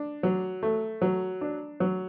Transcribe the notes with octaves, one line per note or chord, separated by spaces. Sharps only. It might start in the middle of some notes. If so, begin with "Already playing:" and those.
Already playing: D4
F#3
A3
F#3
D4
F#3